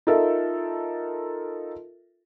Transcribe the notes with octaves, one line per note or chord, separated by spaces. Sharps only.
D#4 F4 A4 A#4 E5